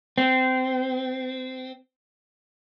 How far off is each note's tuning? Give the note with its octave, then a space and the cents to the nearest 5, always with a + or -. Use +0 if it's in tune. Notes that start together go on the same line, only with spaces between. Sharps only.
C4 -20